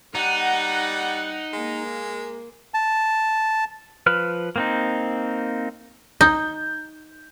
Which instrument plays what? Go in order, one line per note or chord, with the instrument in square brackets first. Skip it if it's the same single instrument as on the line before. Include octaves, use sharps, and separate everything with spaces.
[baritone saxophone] G3 [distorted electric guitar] D#4 [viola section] F#5
[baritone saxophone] G#3 [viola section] A#3
[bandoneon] A5
[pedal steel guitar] F3 B4 F6
A#3 C4 D#4
[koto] D#4 [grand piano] G6